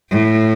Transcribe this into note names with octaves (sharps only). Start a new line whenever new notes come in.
A2